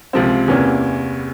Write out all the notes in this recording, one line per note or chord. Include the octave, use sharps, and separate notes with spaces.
C#2 C3 F3 C4
E2 C3 E3 A#3 C#4